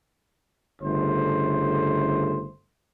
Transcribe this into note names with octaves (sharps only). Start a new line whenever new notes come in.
G1 C#3 A3 C5